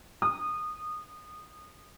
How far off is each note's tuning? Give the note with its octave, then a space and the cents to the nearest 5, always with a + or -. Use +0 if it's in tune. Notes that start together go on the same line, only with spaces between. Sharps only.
D#6 -20